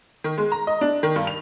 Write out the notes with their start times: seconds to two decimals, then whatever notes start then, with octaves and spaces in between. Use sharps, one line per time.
0.24 D#3
0.38 G#3
0.52 A#5
0.67 D#5
0.81 D4
1.03 D#3
1.16 G2
1.27 F7